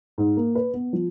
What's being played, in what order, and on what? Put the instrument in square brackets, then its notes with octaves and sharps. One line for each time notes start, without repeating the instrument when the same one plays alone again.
[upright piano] G#2
A#3
B4
B3
F3